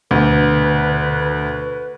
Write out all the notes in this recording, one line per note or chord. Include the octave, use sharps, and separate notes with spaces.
D2 B2 D3 B4